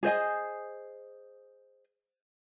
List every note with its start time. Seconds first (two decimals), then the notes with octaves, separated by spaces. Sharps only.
0.03 G#4 C5 D#5 G#5